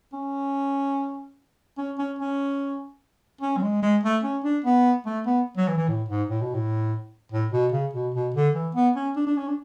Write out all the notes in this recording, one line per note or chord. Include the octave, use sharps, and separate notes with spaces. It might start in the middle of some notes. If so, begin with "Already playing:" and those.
C#4
C#4
C#4
C#4
C#4
F#3
G#3
G#3
A3
C#4
D4
B3
A3
B3
F#3
E3
E3
A2
G#2
A2
B2
A2
A2
B2
C#3
B2
B2
D3
E3
B3
C#4
D4
D4
C#4
D4